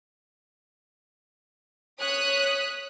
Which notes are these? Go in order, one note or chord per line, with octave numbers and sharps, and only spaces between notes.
C#5 D#6 F#6 B6